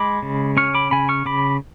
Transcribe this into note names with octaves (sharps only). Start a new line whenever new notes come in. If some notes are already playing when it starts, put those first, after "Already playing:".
Already playing: G#3 B5 D6
C#3
C#4 C#6 F6
B5 D6
C#3 G#5 B5
C#6 F6
C#3 B5 D6